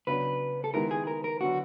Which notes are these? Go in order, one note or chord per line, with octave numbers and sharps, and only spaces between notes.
C#3 F#3 B3 D4 B4
A4
D#3 G#3 B3 E4 G4 A#4
G#4
A#4
A#4
D3 F#3 B3 F#4